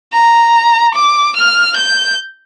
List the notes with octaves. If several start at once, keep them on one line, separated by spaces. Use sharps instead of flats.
A#5
D6
F6
G6